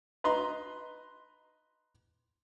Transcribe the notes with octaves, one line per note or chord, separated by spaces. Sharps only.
B4 D#5 A#5 C6